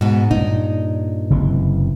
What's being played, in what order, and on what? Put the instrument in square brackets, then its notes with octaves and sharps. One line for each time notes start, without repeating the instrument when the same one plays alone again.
[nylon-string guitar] G#2 B2
[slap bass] G2 A#2 [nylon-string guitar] D#4
[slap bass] F#1 C3 E3